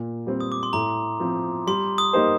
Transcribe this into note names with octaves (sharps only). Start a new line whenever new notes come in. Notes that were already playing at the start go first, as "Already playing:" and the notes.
Already playing: A#2
G3 C4
D#6
D6
C6
A2 A#5
F3 C4
G3 C6
D#6
A#3 D#4 G4 C5